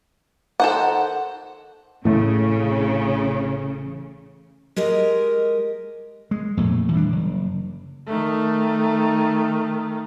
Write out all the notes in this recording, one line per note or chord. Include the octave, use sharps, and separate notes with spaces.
D#3 F#4 A4 C5 F#5
A1 A2 C#3 A3
G#3 G4 A#4 D#5
G#3
F2 A#2 A3
E3 G3 C#4 D4
F#1
D#3 A3